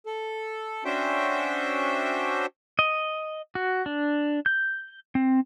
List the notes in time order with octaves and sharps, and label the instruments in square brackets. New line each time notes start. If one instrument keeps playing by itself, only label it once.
[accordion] A4
C#4 D4 F#4 C5 E5 G5
[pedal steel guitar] D#5
F#4
D4
G6
C4